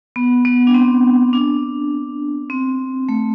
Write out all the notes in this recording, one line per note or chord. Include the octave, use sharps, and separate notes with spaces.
B3
B3
D4
C4
D4
C4
A3